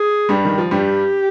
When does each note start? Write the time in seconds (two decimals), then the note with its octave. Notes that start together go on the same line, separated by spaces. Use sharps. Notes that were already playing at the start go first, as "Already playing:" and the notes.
Already playing: G#4
0.29 G2 G3
0.45 D#3
0.58 F3
0.71 G2 G3 G4